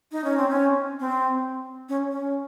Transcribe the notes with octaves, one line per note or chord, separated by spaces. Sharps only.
D#4
C#4
C4
C#4
C4
C#4
C#4